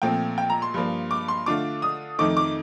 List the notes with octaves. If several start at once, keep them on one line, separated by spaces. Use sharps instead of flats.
A#2 F3 A3 C4 G5
G5
A#5
C6
G2 F3 A#3
D6
C6
D3 A3 D4 F4 D6
D#6
F2 D#3 A3 D#4 D6
D6